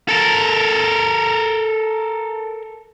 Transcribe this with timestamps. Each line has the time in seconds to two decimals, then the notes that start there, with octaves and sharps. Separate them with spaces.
0.08 A4 A#4